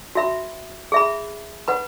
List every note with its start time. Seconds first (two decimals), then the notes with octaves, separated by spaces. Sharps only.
0.15 F#4 E5 B5
0.92 G#4 E5 B5
1.68 B4 F#5 B5